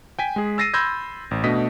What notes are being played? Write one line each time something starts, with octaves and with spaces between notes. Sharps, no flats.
G5 G#5 B6
G#3 G#4
E6 A6 A#6 C7 D#7
B5 C6 E6 G6 G#6 A#6
A1
B2 A3 D4 D#5 B6